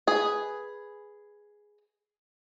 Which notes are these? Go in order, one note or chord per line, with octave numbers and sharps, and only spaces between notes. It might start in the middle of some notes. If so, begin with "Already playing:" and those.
G#4 B4